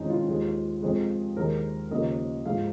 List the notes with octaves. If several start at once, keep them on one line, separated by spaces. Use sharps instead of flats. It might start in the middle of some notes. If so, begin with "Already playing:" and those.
Already playing: F2 D#3 G#3 C#4 D#4
F4
D#2 D#3 G#3
F2 F3 G#3
D#2 D#3 G#3 A#4
D#2 C#3 F3 A#3 D#5
G#2 F3 G#3 F5